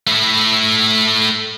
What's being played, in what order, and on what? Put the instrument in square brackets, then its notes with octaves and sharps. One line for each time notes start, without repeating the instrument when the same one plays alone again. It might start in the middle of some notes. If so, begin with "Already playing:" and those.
[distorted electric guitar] A3 E4